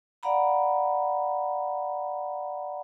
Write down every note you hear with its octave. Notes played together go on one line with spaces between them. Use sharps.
D5 F5 F#5 A#5 B5